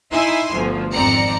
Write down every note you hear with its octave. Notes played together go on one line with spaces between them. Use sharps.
D#4 E4 E5 G#5 C6
G1 D2 F3
G#1 F2 C4 D5 A#5 C#7